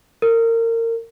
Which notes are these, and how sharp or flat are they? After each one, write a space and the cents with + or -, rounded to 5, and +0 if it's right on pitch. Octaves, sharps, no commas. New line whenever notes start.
A#4 -30